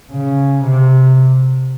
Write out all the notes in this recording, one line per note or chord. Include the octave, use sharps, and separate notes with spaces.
C#3
C3